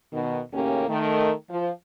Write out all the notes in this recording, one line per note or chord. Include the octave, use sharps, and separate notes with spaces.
B2 D#3
D#2 A2 C#3 A#3 C#4 G4
D#3 A3
F3